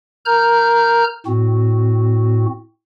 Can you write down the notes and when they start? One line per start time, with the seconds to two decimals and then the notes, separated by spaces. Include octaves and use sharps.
0.26 A#4 A#5 F6 G6
1.26 A2 C4 F#4